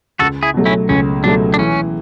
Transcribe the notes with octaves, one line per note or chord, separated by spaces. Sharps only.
C#2 F#4 A4
E4 G#4
B2 F#3 A3
C#4 E4
C#2 C#4
B2 F#3 A3 D4
D4
E3 C#4